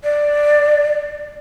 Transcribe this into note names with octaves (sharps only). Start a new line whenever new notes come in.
D5